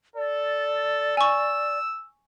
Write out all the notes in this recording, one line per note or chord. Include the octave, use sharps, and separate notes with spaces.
A4 D5
G#5 C#6 E6